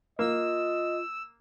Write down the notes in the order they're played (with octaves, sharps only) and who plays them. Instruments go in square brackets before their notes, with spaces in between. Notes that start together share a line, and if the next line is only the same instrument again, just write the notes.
[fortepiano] A#3 [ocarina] F4 [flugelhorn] D#5 [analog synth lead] E6